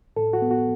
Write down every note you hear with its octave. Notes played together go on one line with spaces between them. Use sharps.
A2 A4
F#4
B3
F#4